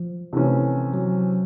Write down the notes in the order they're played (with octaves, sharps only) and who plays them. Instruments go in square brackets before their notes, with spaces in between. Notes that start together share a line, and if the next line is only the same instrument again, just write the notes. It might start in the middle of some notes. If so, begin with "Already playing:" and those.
Already playing: [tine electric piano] F3
[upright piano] C3 E3 A3 C#4
[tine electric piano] F#3